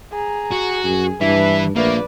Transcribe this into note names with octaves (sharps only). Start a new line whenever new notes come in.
G#4 A#5
F#4
F#2 G#4
G2 E3 D4 B4 E5
A#1 A3 A#3 B4 D5